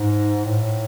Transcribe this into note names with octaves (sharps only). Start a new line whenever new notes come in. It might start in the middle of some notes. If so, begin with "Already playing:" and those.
Already playing: G#2
A2